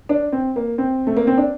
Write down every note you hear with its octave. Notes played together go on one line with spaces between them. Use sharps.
D4
C4
A#3
C4
A3
A#3
C4
D4